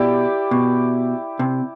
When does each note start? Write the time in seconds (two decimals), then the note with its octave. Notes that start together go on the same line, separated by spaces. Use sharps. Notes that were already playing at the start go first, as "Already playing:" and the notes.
Already playing: B2 E4 G4 D5
0.51 B2
1.39 C3